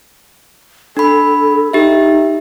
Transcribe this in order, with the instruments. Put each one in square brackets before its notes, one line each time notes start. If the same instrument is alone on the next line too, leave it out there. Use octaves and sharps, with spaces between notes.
[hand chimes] D4 B5 [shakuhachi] A4
[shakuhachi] D#4 [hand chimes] G4 E5